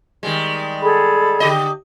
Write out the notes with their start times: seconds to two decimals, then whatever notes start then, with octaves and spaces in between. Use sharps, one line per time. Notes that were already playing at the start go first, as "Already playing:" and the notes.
0.23 D#3 G3 G#3
0.82 G#4 A4 B5
1.40 D3 G4 D#5